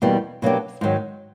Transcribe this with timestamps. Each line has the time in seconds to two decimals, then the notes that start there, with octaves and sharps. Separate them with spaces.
0.02 E2 B2 G3 A#3
0.42 B2 F#3 A#3 D4 G4
0.81 G#2 D#3 F#3